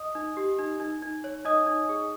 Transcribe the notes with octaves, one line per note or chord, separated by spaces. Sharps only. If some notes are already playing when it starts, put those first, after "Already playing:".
Already playing: D#5 D#6
D#4
G4
D#4
D#4
D#4
C#5
D#4 D#5 D#6
D#4
G#4